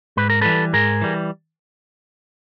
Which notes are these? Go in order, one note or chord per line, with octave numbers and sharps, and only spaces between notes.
G#2 B4
A#4
E3 G3 A4 B4
G#2 G#4 A#4
E3 G3